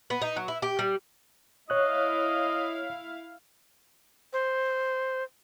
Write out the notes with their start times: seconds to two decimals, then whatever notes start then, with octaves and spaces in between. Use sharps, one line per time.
0.10 B3
0.22 D#4
0.36 F#3
0.48 E4
0.62 G4
0.79 G3
1.70 E4 C#5 D#5 F5 F#6
4.33 C5